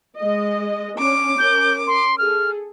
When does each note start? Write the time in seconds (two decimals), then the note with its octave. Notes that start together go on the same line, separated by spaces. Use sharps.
0.17 G#3 D#5
0.99 C#4 D4 D6
1.38 C#4 A#4 G6
1.87 C6
2.18 G#4 A4 F6